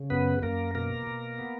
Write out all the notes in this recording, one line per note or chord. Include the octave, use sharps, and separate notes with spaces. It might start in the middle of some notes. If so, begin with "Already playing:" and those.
Already playing: C#3
F#2 B3 B4
F#2 A#3 A#4
B2 A#3 A#4
B2
B3